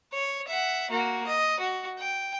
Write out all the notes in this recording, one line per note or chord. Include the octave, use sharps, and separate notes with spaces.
C#5
E5 F#5
A#3 F#4
D#5
F#4
G5